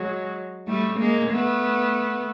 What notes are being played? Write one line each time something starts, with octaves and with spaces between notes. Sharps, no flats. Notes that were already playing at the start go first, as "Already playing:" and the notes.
Already playing: F#3 G#3
G3 A3
G#3 A#3
A3 B3